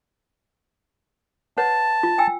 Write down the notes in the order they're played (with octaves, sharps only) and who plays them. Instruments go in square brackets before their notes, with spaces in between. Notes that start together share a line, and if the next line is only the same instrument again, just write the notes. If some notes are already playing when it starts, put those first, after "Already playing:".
[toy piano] B4 C#5 F#5 [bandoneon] A5
[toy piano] F4
G5 G#5 E6